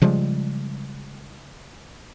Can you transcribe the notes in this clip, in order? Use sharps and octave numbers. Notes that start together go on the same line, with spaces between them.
C#3 F3 G3 G#3